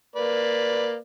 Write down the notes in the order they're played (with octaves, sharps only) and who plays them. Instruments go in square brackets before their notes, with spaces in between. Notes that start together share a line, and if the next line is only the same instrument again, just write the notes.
[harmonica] A#3 B4 D5